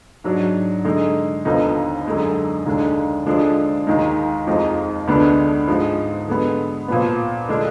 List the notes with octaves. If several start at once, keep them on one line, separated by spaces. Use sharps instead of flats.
G#2 F#3 D4
D3 G#3 D#4
D#2 D3 F3 B3 D#4
F#2 D3 G#3 D#4
D#2 D3 G#3 D4
D3 F3 G#3 D4
D#2 D#3 G#3 D#4
F2 F3 G#3 D#4
D2 D3 G#3 B3 D4
G#2 F3 G#3
D3 G#3 B3
A#2 F3 B3
D3 G#3 D4